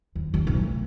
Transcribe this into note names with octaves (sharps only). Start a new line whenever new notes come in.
D#2
D#2
B1
A3